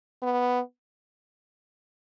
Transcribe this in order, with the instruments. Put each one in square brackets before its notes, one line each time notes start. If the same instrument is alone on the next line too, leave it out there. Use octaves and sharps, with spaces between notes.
[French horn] B3